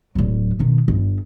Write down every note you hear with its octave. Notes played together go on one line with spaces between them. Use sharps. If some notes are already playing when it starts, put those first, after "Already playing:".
D1 F#3
B2 D#3
G1